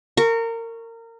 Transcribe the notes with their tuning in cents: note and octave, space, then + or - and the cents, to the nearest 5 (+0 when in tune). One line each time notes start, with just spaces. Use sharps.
A#4 -25 C#6 +0